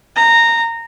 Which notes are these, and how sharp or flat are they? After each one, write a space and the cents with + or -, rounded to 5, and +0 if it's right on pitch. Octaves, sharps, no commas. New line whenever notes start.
A#5 -15